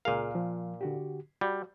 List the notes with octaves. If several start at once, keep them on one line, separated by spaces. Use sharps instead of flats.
C#2 A#2 G#4 A#4 F5
F3
D3 F#4 G4
G3 F#4